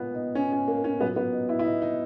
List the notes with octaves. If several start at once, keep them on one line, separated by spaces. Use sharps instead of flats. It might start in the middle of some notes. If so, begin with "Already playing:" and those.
Already playing: A#2 G#3 B3
D#4
C#4
C#4
A#3
C#4
A#2 F#3 B3
B3
D#4
E4
E4
D#4
D#4